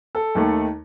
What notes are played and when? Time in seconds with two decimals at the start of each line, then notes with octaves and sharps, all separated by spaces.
0.15 A4
0.35 D#2 D#3 A3